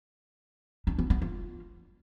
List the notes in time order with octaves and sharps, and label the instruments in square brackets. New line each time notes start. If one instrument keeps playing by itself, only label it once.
[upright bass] D4
B3
B3
F4